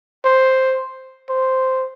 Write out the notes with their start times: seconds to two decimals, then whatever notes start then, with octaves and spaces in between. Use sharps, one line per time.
0.25 C5
1.29 C5